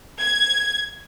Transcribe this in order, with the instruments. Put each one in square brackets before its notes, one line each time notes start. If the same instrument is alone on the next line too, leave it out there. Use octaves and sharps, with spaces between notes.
[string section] G#6